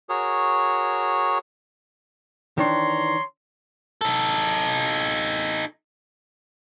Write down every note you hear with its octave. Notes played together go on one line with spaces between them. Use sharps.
F#4 G#4 A#4 C#5
D#3 E3 D4 C#5 A#5 C6
D#4 A4